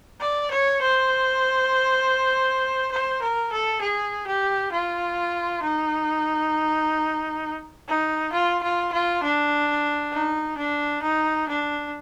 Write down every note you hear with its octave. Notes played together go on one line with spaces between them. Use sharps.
D5
C#5
C5
C5
A#4
A4
G#4
G4
F4
D#4
D#4
F4
F4
F4
D4
D#4
D4
D#4
D4